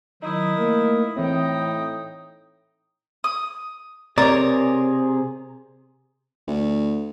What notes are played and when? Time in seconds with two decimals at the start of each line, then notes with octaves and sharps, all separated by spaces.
0.22 D#3 F#3 D#4 E4 D#6
0.55 A3 A#3 A#4
1.16 A2 E3 C4 D#4 G5 D#6
3.24 D#6
4.18 C3 G#4 A#4 C#5 D5
6.48 D2